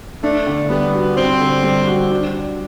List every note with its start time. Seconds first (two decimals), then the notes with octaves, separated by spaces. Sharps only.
0.23 A3 D4
0.47 D3
0.69 G3 B3
0.93 F#4
1.17 C4 D4
1.40 D3
1.63 G3
1.87 F#4
2.11 D4